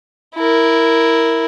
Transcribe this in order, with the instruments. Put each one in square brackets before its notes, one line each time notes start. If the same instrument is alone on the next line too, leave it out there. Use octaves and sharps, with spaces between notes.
[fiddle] E4 A#4